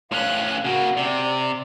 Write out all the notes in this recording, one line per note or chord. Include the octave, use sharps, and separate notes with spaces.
A2 C#4 F5 F#6
C#3 A#3 F#4
C3 D5